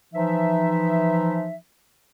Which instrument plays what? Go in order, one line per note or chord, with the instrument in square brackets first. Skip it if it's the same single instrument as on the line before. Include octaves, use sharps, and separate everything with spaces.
[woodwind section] E3 F3 D#4 E5